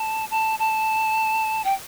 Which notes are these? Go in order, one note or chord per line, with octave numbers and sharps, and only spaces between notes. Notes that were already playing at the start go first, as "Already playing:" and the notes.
Already playing: A5
A5
A5
G5